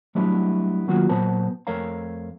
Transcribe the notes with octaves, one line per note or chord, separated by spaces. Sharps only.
F#3 G3 A3 B3 D4 E4
D#3 F#3 A#3 B3 F4 F#4
A#2 F#3 B3 B4 C5 A5
F2 A3 A#4 C#5 F5 A#5